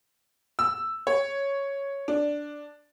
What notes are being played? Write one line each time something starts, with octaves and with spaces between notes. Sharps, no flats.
E6
C#5
D4